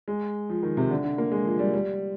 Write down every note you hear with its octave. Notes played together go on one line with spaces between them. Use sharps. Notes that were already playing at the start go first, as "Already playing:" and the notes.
G#3
F3
D#3
C3
D3
D3
A#3
G#3
F3
G3
G3